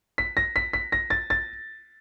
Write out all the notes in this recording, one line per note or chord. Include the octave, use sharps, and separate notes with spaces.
B6
A#6
B6
B6
A#6
A6
A6